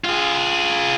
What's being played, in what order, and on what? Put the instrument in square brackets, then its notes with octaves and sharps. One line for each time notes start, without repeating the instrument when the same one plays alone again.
[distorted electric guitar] F4 G#4